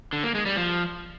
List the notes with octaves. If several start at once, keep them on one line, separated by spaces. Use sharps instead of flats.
D3
A#3
G#3
G3
F3